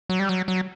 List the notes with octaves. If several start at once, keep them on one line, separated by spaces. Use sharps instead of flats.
F#3
G3
F#3
F#3